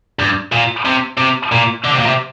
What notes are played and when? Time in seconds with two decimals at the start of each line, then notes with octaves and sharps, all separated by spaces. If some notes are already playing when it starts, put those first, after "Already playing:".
0.19 G2
0.52 A#2
0.85 C3
1.18 C3
1.52 A#2
1.84 D3
1.91 C3
1.99 A#2
2.06 C3